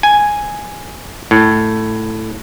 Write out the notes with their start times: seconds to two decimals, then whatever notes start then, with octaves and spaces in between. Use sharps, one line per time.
0.03 G#5
1.31 A2